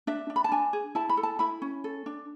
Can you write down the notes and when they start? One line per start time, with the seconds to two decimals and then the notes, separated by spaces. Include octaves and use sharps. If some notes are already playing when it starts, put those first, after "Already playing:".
0.07 D4 E5
0.30 D4
0.36 B5
0.44 A5
0.52 D4 G#5
0.73 G#4
0.95 E4 A5
1.09 B5
1.17 A4
1.23 A5
1.39 E4 B5
1.62 C#4
1.84 A4
2.06 D4